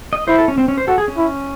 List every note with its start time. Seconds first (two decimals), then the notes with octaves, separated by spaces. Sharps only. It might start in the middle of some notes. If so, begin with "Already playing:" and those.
0.13 D#5
0.28 E4 C5
0.38 A4
0.48 C#4
0.58 C4
0.68 C#4
0.78 C5
0.88 F#4 A4
0.98 G#4
1.08 C#4
1.18 E4